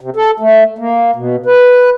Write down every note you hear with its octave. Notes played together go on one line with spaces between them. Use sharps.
C3
A4
A3
A#3
B2
B4